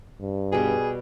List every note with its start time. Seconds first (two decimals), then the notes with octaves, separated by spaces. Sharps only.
0.21 G2
0.52 B2 G3 G#4